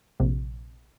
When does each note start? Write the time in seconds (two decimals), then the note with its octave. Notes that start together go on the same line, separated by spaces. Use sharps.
0.20 A#1 C3